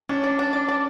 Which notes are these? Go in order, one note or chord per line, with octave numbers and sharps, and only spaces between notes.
C#4 D4
D5
D4
D5
D5